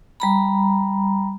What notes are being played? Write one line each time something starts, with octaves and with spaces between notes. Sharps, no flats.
G3 A#5 B5